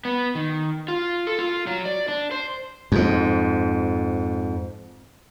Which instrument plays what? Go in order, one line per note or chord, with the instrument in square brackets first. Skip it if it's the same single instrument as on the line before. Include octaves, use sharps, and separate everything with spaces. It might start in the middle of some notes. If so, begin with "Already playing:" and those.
[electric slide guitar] B3
D#3
F4
A4
F4
F#3
D5
D4
C5
[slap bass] F2 G#2